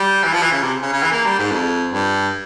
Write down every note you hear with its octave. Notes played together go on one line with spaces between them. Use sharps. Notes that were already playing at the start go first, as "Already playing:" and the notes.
Already playing: G3
E3
F3
E3
C#3
C3
C#3
C#3
E3
A#3
G3
G#2
F2
G2